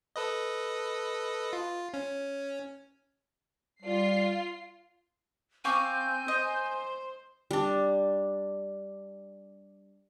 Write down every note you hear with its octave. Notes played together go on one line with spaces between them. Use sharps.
A4 B4 D#5
F4
C#4
G3 F4 C7
C4 F5 G#5 C#6 D6 G6
C5 D#5
G3 D4